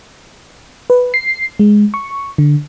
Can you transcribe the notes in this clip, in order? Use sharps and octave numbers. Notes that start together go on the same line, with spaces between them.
B4
C7
G#3
C#6
D3